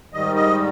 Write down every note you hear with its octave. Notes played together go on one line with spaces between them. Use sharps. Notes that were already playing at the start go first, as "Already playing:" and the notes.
G#2 D#3 G3 D#5
D#5